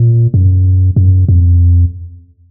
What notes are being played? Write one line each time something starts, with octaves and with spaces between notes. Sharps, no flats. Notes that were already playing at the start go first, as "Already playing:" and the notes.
Already playing: A#2
F#2
F#2
F2